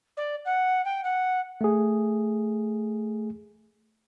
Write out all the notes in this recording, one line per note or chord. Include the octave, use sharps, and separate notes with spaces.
D5
F#5
G5
F#5
A3 G#4